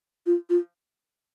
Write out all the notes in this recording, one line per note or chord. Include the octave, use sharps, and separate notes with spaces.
F4
F4